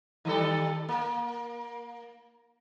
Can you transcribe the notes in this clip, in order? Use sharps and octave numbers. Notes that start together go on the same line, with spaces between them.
D#3 G3 A4
A#3